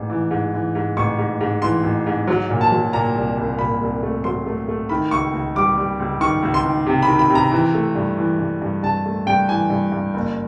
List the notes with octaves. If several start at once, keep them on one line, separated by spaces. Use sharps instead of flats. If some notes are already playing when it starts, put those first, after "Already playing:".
Already playing: A1 G#2
E3
G#2
E3
G#2
A1 C#6
G#2
G#2
E3 C6
A1
G#2
F#3
A#2
A5
F#3
A#2 A#5
C2
C2
A#2 B5
C2
A3
F#3 C6
A3
A3
D#3 B5
C#2 C#6
C#2
G3 D6
G3
C#2
D#3 C#6
C#2
C6
D#3
C3
B5
D#3
B5
C3 A#5
E3
A3
G2
E3
G2
G2
G2 A5
A3
G2 G5
E3 G#5
G2
G2
F#1